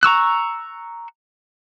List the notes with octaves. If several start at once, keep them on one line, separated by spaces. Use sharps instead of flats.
A#5 C#6 E6 F#6